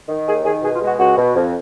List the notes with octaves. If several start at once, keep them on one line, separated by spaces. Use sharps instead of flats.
D#3
D#2 G#4
D#3 G#4
B2 G#4
F4
G#3
F#4
C#2 F#4
B2
F2